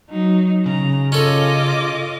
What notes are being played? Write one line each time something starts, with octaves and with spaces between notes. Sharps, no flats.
F#3 D#4
C#3 A#5
C#4 F4 A4 D#5 D6